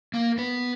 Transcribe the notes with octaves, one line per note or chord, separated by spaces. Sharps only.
A#3 A#4
B3 B4